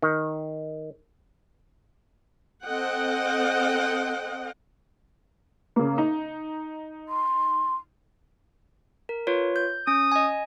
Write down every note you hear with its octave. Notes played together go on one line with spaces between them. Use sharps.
D#3
C4 A4 D#5 F#5 G5
C#3 A#3
D#4
C6
A#4
F4 B4 C#5
G6
C#4 D#6
D#5 G#5